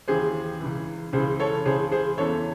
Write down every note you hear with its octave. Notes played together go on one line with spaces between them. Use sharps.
D#2 C#3 E3 G#4 C5
C#2 C#3 E3
C#2 C#3 E3 G#4 C5
A4 C#5
C#2 C#3 E3 G#4 C5
G#4 C5
E2 C#3 E3 A4 C#5